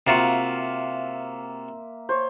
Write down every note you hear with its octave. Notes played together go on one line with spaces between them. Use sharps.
C3 A#3 F4 F#4 E5 C6
C5 C#5